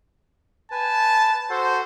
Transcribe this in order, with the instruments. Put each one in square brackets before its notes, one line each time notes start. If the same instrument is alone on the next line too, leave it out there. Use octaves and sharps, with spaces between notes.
[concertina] B4 G#5 [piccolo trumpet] A5
[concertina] F#4 A4 F#5 [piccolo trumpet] C5